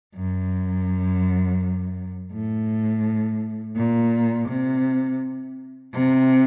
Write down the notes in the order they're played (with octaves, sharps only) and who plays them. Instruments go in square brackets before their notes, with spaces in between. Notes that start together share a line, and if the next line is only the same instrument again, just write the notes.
[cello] F#2
A2
A#2
C3
C3